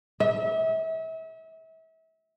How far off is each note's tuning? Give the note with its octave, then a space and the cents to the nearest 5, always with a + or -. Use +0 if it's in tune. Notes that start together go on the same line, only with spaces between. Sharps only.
E5 -35